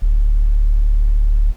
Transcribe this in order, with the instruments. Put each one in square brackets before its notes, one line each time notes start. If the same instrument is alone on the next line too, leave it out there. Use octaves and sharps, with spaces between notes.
[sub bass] D1